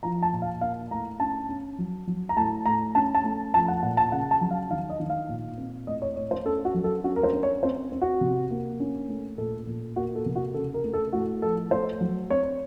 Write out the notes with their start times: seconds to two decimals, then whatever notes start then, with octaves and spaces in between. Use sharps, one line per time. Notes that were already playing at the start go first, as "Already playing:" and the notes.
0.03 F3 A#5
0.22 A5
0.33 A#2
0.42 F5
0.61 A#3 F5
0.91 A2 A#5
1.20 C#4 A5
1.49 C#4
1.78 F#3
2.07 F#3
2.29 A#5
2.37 A2 A5
2.66 A2 A#5
2.95 C#4 A5
3.15 A5
3.24 A3
3.54 F3 A5
3.68 F#5
3.83 A#2 F#5
3.97 A5
4.12 C#3 F#5
4.31 A5
4.41 F#3
4.51 F5
4.71 D#3 F5
4.90 D#5
5.00 D#3
5.10 F5
5.29 A#2
5.58 C4
5.87 A2 D#5
6.02 C#5
6.16 A2 C#5
6.31 C5
6.46 C#4 A4
6.65 F#4
6.74 F#3
6.84 A4
7.04 C#4 F#4
7.16 A#4
7.23 C5
7.33 C#4
7.43 C#5
7.63 C4 C5
7.92 C4
8.02 F#4
8.21 C3
8.51 A#3
8.80 C#4
9.09 A3
9.38 A#2 A4
9.67 A#2
9.96 A#3 F#4
10.15 A4
10.26 C3
10.36 F#4
10.54 C#3 A4
10.74 A#4
10.84 A3
10.93 A4
11.13 A2 F#4
11.42 F3 A4
11.71 A3 C5
12.01 F#3
12.30 C4 C#5